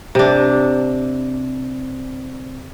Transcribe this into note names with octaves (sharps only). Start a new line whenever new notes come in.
C3 D4